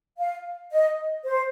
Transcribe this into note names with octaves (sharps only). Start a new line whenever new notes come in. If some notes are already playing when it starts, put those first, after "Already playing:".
F5
D#5
C5